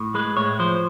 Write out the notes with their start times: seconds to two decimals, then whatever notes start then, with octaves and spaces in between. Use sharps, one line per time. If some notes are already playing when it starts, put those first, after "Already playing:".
Already playing: A2
0.14 G#3 B4
0.37 A2 C#5
0.59 F3 C5